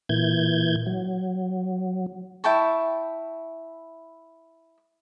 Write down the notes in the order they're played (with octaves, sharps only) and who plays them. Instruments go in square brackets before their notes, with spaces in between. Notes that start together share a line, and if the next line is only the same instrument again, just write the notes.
[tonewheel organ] A#2 E3 G6 G#6
F#3
[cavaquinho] E4 G5 A5 C#6